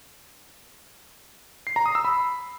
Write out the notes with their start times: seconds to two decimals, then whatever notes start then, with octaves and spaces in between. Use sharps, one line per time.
1.67 C7
1.76 A#5
1.86 D#6
1.95 E6
2.05 B5